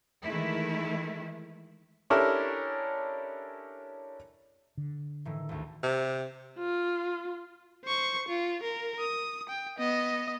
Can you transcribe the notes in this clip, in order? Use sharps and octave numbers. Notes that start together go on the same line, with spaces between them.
D#3 E3 G#3 A3 E4
C#4 D4 E4 G4 A4 A#4
D3
A2 D#3 E3
G#1 D2
C3
F4
C5 C#6
F4
A#4
D#6
G5
B3 D#5